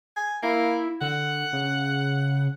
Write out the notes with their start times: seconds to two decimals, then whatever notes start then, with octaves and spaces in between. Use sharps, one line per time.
0.16 G#5
0.43 A#3 E4
1.01 D3 F#5
1.53 C#3